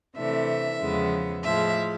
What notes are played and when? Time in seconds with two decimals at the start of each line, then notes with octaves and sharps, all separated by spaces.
0.16 C3 E3 A3 D4 E5
0.80 E2 C#3 F3 G#3 B3
1.44 A2 F3 G#3 E5